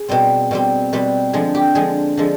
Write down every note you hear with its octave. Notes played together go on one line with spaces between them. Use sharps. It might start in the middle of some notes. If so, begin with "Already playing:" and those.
Already playing: G#4
B2 G3 C4
B2 G3 C4
B2 G3 C4 B4
D3 F3 G#3 G#4
G4
D3 F3 G#3 G#4
D3 F3 G#3